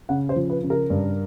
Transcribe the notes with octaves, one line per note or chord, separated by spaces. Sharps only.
C#3 F#5
C5
F3
B4
C#3
A#4
G2